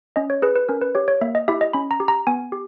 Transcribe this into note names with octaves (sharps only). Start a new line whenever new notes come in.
C#4 D#5
C#5
G#4 B4
B4
C#4 A#4
B4
G4 C#5
C#5
A#3 E5
D#5
E4 G4 E5
D#5
C#4 B5
A#5
G4
A#5
B3 G#5
G4